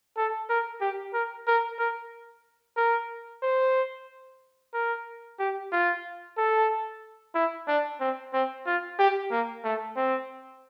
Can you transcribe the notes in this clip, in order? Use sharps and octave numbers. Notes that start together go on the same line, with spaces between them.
A4
A#4
G4
A#4
A#4
A#4
A#4
C5
A#4
G4
F4
A4
E4
D4
C4
C4
F4
G4
A#3
A3
C4